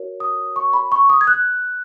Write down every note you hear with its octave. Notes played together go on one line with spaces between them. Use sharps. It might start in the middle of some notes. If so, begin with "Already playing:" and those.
Already playing: F#4 A#4 C#5
D#6
C#6
B5
C#6
D#6
G#6
F#6